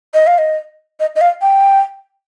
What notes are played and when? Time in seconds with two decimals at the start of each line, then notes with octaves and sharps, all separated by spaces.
0.14 D#5
0.27 F5
0.38 D#5
1.00 D#5
1.16 D#5
1.21 F5
1.42 G5